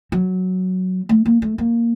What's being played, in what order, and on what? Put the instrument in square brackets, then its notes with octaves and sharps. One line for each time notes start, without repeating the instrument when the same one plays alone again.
[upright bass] F#3
A3
A#3
A3
A#3